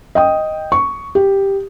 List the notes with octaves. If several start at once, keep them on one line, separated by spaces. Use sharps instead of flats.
D#5 G5 D#6
C#6
G4